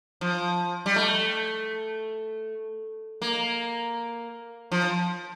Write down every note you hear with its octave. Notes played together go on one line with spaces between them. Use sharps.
F3
G3
A3
A#3
F3